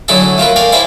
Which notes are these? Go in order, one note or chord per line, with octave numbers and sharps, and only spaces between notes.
A2 D3 F#3 E4 G#4 A4
A3 F4 A#4 B4
A#4 D5 F5 G5 G#5
E4 C5 D5 E5 G5 G#5